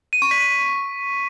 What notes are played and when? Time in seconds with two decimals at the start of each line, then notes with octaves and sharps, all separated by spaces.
0.13 D#7
0.22 C#6
0.31 B6
0.40 D#7